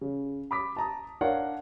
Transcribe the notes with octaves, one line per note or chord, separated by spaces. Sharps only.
C#3
B5 D6 B6
A5 A#5 D#6
D4 A#4 C#5 F5 F#5